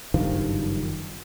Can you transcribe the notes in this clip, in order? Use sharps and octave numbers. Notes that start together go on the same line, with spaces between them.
F#1 G2 D#3 F3